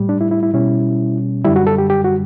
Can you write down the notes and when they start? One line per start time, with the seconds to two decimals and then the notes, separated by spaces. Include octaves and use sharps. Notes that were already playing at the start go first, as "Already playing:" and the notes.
Already playing: A2 G3
0.09 D4
0.21 E4
0.31 E4
0.43 E4
0.53 B2 G3 C#4 E4
1.45 F#2 D3 G3 E4
1.56 F#4
1.67 A4
1.78 G4
1.90 G4
2.04 F#4